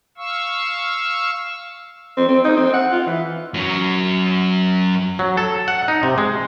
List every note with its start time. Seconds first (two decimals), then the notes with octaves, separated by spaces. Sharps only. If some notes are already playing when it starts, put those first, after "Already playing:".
0.18 F5 C#6 E6
2.17 C4
2.28 C4
2.45 D#4
2.57 C4
2.74 F#5
2.92 F4
3.07 E3
3.54 F#2 F#3
5.19 F#3
5.37 A4
5.68 F#5
5.88 D#4
6.03 C3
6.18 G#3